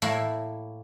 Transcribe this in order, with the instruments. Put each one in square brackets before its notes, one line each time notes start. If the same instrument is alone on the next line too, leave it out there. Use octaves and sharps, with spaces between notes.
[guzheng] A2 A#3 E4